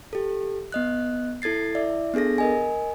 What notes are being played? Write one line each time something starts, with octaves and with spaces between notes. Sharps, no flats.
G4 A4
B3 D#5 F#6
E4 A4 G#6 A6 C7
E4 D5 E5
B3 D4 G#4 A4 A#6
A#4 D#5 G#5